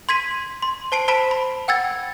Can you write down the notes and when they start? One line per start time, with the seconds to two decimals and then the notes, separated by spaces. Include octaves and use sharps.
0.09 C6 G#6 B6 D#7
0.62 C6
0.92 C5 A5 C7 D7
1.08 C5 A5 B5 B6 D7 E7
1.31 B5
1.68 F#5 G5 E6 G#6 A6